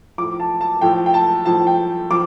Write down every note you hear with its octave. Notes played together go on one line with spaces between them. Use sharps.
A2 F3 D6
A5
A5
A2 F3 G5
G5
A5
A2 F3 A5
G5
F3 D6